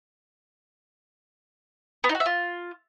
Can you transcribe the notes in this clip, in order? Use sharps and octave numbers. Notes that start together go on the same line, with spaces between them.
B3
D#4
F#4
E5
F4